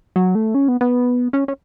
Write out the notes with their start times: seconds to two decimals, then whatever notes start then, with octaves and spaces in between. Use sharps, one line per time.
0.16 F#3
0.35 A3
0.55 C#4
0.68 B3
0.81 B3
1.33 C#4
1.48 C#4